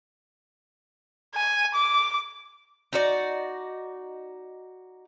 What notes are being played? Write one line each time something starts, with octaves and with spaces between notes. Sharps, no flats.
G#5
D6
D#4 F#4 D5